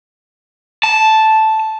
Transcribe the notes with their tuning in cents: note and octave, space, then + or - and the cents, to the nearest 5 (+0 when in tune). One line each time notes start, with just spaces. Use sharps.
A5 -5